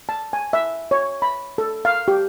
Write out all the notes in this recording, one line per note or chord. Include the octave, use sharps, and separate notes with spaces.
A5
G#5
E5
C#5
B5
A4
F5
G4